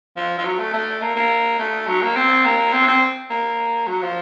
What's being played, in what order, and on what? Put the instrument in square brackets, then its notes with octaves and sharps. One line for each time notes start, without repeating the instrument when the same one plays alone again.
[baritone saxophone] F3
F3
F#3
A3
A3
A#3
A#3
A3
F#3
A#3
C4
A#3
C4
C4
A#3
F#3
F3